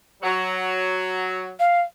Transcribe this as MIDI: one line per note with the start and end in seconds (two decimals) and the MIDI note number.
0.23 1.51 54
1.60 1.81 77